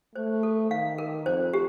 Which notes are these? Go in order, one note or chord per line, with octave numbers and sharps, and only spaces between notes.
A3 C5
A4
D#3 F5
A#4
F2 C5
G4